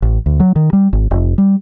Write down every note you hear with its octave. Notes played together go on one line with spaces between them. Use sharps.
A1
D2
F#3
D#3
G3
G#1
F1
G3